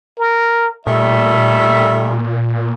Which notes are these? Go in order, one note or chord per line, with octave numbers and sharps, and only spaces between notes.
A#4
A#2 D#3 G3 A3 E5